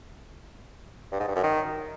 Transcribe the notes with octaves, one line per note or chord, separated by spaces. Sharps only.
G2
G#2
G2
F#2
D#3